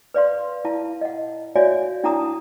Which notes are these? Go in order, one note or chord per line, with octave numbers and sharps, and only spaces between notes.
B4 D5 F5 C6
E4 F5 A5
D#5 F#5
F#4 C#5 D5 E5 F5 G#5
D4 E4 F#5 A5 A#5 D#6